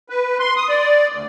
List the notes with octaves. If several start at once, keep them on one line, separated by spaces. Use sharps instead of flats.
B4
C6
D#6
D5
D2